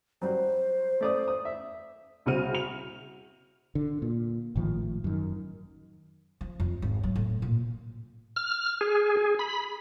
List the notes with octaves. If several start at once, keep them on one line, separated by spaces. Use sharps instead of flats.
F#3 G3 C5
A3 D5 D#6
D#6
E5
C2 C#3 C4 F#4 F6 D#7
F7
D3
A#2
G#1 A2 D#3 F3
F#2 D#3
F3
F2
G#1
F#3
A2
A#2
F6
G#4
G#4
B5